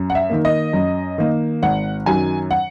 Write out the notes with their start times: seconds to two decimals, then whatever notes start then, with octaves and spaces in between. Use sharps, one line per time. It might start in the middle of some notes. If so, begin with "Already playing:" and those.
Already playing: F#2
0.10 F#5
0.15 E5
0.30 D#3 A#3
0.45 D#5
0.73 F#2
1.18 D#3 A#3
1.62 G#1 F#5
2.06 F#2 D#3 F#3 G#5
2.51 F#5